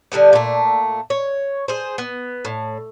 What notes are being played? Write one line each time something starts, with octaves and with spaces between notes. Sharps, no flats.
D3 E3 G3 B3
A#2 A3
C#5
G#4 C5
B3
A2